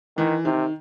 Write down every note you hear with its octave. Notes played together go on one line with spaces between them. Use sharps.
D#3 E3
C3 D#3